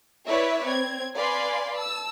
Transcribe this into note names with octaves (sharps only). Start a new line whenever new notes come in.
E4 B4 C#5 D5 E5
C4 G#6
B4 D5 F5 G#5 B5 C6
A5 E6